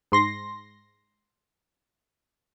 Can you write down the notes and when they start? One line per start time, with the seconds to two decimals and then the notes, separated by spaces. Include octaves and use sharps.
0.12 G#2 C6 A#6